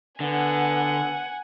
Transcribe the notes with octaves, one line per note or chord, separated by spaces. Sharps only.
D3 B3 F#5 G#5